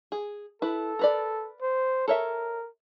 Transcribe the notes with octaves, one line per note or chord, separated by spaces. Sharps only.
G#4
E4 A4 B4
A#4 B4 D5
C5
A4 A#4 C#5 E5